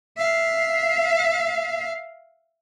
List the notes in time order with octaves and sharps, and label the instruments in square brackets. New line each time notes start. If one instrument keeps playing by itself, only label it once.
[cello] E5 F5